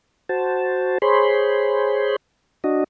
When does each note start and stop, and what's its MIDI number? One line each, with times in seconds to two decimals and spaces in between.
0.29 0.98 66
0.29 0.98 72
0.29 0.98 81
1.02 2.16 68
1.02 2.16 72
1.02 2.16 73
1.02 2.16 83
1.02 2.16 84
2.64 2.84 62
2.64 2.84 66
2.64 2.84 75